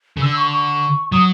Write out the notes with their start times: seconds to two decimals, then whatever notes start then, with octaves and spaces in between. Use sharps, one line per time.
0.17 C#3
0.22 D3 E6
0.37 C#6
0.52 C#6
1.12 F#3 D#6